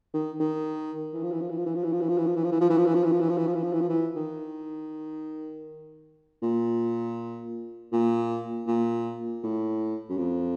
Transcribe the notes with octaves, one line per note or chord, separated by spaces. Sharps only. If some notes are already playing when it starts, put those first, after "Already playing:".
D#3
D#3
E3
F3
E3
F3
E3
F3
E3
F3
E3
F3
E3
F3
E3
F3
E3
F3
E3
F3
E3
F3
E3
F3
E3
F3
E3
F3
E3
F3
E3
F3
E3
F3
E3
D#3
A#2
A#2
A#2
A2
F#2
F2